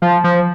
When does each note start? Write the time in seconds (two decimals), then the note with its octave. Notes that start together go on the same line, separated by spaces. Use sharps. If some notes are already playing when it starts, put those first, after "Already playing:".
0.02 F3
0.24 F3